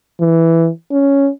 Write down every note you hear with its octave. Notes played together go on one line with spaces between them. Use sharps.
E3
C#4